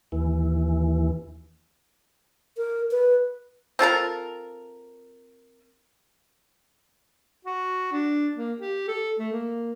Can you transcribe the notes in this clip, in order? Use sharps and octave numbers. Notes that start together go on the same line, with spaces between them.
D#2 E3
A#4
B4
C4 F4 A4 A#4
F#4
D4
A#3
G4
A4
A3
A#3